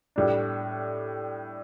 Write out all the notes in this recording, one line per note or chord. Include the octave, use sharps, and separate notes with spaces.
A2 G3 D4